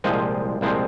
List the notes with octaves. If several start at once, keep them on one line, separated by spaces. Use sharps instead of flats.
C2 A#2 F3 G#3 C4 D#5
C2 A#2 F3 G#3 C4